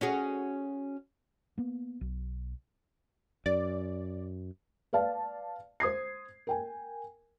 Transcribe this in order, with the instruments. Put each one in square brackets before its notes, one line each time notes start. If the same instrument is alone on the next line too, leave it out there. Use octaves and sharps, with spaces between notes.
[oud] C#4 F#4 G#4
[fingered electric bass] A#3 B3
B1
[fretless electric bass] F#2 [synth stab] D5
[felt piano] B4 D5 F5 A5
C5 D#6 G#6 C7
A#4 G5 G#5